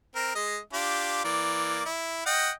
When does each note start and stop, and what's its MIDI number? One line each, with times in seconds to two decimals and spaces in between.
0.15 0.31 60
0.15 0.31 70
0.35 0.59 56
0.35 0.59 75
0.73 1.22 62
0.73 1.22 65
0.73 1.22 67
1.24 1.85 52
1.24 1.85 58
1.24 1.85 74
1.85 2.26 64
2.26 2.50 75
2.26 2.50 78
2.26 2.50 79